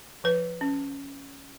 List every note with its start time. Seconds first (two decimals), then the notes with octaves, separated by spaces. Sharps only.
0.24 F3 B4
0.61 C#4